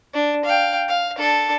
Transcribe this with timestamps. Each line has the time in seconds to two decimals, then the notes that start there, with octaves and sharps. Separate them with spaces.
0.13 D4
0.45 F5 G5
0.88 F5
1.18 D4 A4